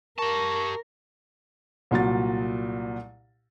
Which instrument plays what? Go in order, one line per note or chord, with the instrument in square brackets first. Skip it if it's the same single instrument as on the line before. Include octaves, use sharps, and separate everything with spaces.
[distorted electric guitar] G4 A5 [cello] A#4 [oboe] C#6
[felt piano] C2 A#2 F#3 A6